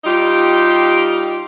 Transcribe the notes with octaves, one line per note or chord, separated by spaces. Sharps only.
G3 D#4 F4 G4